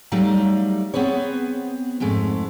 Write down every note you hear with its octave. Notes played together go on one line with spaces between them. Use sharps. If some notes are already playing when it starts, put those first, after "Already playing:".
F#3 G3 A3 D#4 F5 A#5
B3 C4 G#4 B4 C#5
F2 G#2 G#3 A3